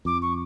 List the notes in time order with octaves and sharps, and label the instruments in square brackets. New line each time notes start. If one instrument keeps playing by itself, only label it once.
[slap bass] F2 [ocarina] D6
[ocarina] C#6